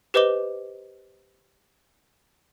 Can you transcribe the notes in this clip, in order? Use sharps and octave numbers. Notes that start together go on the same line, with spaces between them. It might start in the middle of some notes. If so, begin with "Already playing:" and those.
G4 B4 C5 D#5 D6 G7